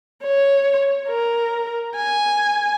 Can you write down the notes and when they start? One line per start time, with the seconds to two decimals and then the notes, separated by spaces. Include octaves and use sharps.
0.23 C#5
1.08 A#4
1.96 G#5